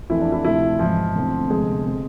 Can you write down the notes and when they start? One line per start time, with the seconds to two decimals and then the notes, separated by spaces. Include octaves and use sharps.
0.09 F2 E3 A3 E4
0.21 D4
0.32 E4
0.44 D2 C3 F3 E4
0.79 G#1 G#2 E3 F3 F4
1.15 E1 D2 D3 A3 C4
1.50 F1 F2 D3 G#3 B3 G#4
1.85 G#3 C4